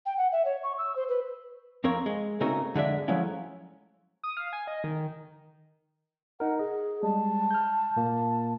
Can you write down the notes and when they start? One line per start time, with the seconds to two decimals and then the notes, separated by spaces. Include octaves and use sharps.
0.06 G5
0.17 F#5
0.32 E5
0.45 C#5
0.63 C#6
0.78 E6
0.96 C5
1.09 B4
1.84 F2 C4 A#4 C#5
2.06 G#3
2.41 C#3 A3 C4 D#4 F#4 A#4
2.74 F2 D3 G#3 D4 E5
3.08 F3 F#3 G#3 A3 C#4 E4
4.23 D#6
4.37 F5
4.53 G#5
4.67 D#5
4.84 D#3
6.40 D#4 A#4 F#5
6.59 G#4 D#5
7.03 G3 G#3 A5
7.51 F6 G6
7.97 A#2 A#3